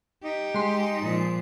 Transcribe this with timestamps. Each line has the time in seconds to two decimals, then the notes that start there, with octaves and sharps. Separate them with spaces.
0.24 D#4 G4
0.54 G#3 C6
1.01 A#2 F3